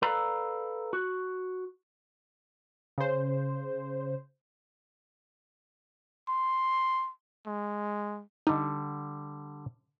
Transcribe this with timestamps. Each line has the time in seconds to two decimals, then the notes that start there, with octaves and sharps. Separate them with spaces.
0.02 A4 B4 D5 F5 A#5 B5
0.93 F#4
2.98 C#3 C5
6.29 C6
7.47 G#3
8.47 D3 G3 D#4